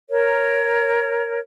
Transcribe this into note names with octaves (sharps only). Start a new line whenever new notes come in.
A#4 C#5